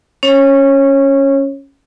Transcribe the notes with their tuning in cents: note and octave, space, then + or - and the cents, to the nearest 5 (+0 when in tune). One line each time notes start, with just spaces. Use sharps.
C#4 +0 C#5 -20